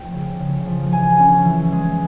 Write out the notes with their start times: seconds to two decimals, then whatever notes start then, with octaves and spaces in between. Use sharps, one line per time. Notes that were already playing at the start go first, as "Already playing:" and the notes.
Already playing: F3 A3 G5
0.13 C#3
0.40 C#3
0.66 F3
0.92 E3 G#5
1.19 C#4
1.45 E3
1.72 G#3